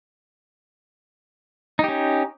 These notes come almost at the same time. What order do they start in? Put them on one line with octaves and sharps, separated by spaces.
D#4 G4 C#4